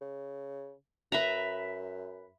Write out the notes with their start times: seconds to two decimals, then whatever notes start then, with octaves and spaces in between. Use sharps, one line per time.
0.01 C#3
1.12 F#2 B4 E5 A#5